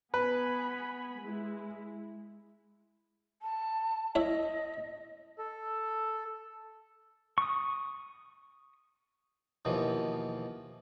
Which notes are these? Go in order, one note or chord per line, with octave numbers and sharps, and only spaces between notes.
B3 B4 G#5 B5
G#3 E4
A5
E4 C#5 D#5 E5
A4
C#6 D#6
D#2 B2 E3 F3